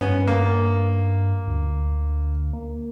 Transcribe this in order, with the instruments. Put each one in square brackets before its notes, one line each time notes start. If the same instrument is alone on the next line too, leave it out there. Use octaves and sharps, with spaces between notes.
[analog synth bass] G2 [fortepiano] B3 C#4
[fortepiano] A#3
[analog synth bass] D2
A#3